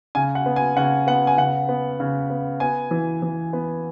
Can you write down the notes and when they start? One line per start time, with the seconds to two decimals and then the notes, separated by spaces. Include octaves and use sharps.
0.15 C#3 G#5
0.35 F#5
0.46 B3
0.56 G#5
0.77 C#3 F#5
1.07 B3 F#5
1.27 G#5
1.38 C#3 F#5
1.69 B3
2.00 C#3
2.30 B3
2.60 B3 G#5
2.91 E3
3.22 E3
3.53 B3